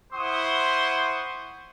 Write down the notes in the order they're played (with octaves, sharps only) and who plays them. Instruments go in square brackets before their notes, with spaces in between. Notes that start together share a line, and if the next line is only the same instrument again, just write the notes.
[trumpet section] E4 C5 F#5 C6 C#6 D#6